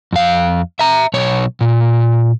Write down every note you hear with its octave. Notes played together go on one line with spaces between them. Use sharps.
F2 F5
E5 A#5
B1 C#5
A#2